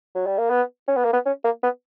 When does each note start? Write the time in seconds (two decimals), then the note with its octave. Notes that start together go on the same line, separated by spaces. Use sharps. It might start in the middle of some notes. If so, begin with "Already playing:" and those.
0.15 F#3
0.27 G3
0.38 A#3
0.50 B3
0.88 C#4
0.97 B3
1.05 A#3
1.13 B3
1.26 C#4
1.44 A#3
1.63 B3